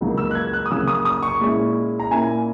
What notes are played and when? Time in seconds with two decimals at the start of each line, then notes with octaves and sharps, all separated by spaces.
0.01 C#2 C#3 F#3 A#3 D#4
0.18 E6
0.31 F#6
0.35 G#6
0.53 F#6
0.66 D#6
0.71 C#3 F#3 A#3 C#4 E6
0.88 D#6
1.05 D#6
1.23 C#6
1.40 A#2 G#3 C#4 E4
2.00 A#5
2.11 A#2 A#3 C#4 E4 G#5